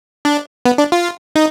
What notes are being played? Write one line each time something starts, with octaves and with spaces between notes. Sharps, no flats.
D4
B3
D4
F4
D#4